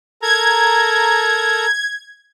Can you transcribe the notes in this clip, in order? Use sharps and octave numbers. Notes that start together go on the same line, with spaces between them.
A4 A#4 A#5 G#6